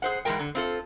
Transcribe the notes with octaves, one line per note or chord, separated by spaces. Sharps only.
G#4 C5 F#5
G#2 E3 F3 G#3 A#4 G5
D3
C4 F4 A4